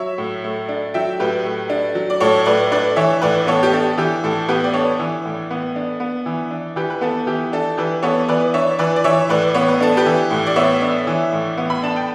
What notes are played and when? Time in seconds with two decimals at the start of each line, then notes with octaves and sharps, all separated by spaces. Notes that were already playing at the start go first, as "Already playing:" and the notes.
Already playing: F#3 C#5 E5
0.18 A2
0.44 A3
0.69 D4
0.94 F#3 E5 G5
1.20 A2 G4 B4
1.45 A3
1.70 D4
1.95 F#3
2.10 D5
2.20 A2 A4 C#5
2.46 A3 B4 D5
2.72 D4 B4 D5
2.96 E3 C#5 E5
3.22 A2 B4 D5
3.47 B3 A4 C#5
3.63 G4
3.73 D4 A4
3.98 E3 G4
4.23 A2 A4
4.49 B3 G4 B4
4.64 D5
4.73 D4 A4 C#5
4.99 E3
5.25 A2
5.51 B3
5.76 D4
6.00 B3
6.26 E3
6.51 D4
6.76 E3 G4 B4
6.90 B4
7.01 B3 A4
7.27 E3 G4
7.53 D4 A4
7.77 E3 G4 B4
8.03 B3 A4 C#5
8.28 E3 B4 D5
8.54 D4 C#5 E5
8.79 E3 B4 D5
8.96 D5
9.04 E3 C#5 E5
9.29 A2 B4 D5
9.54 B3 C#5
9.68 B4
9.80 D4 A4
9.97 G4 B4
10.06 E3
10.31 A2
10.47 D5
10.56 B3 C#5 E5
10.82 D4
11.07 E3
11.32 A2
11.58 B3
11.70 B5
11.83 D4 A5
11.96 G5